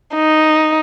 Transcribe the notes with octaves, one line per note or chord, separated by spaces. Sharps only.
D#4